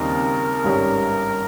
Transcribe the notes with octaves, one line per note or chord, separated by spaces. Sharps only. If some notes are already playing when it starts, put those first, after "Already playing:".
Already playing: D#2 C#3 G3 C4 D#4 A#4
G#1 G2 G3 C#4